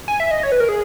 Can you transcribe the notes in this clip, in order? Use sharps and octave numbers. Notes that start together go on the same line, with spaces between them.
G#5
E5
D#5
C#5
B4
A#4
G#4